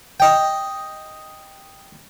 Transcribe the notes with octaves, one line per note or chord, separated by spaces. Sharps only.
D#5 G5